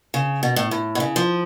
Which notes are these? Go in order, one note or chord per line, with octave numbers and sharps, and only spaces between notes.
C#3
B2
A2
A2
B2
C#3
F3